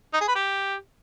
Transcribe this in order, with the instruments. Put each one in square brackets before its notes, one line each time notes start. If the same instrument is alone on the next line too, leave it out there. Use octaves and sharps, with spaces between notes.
[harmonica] D#4
G#4
B4
G4